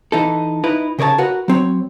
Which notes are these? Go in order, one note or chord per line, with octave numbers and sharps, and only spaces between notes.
E3 D#4 A4
D#4 E4 B4
C#3 A#4 C#5 D5 A5
F#4 A#4 B4 F#5
F#3 C4 C#5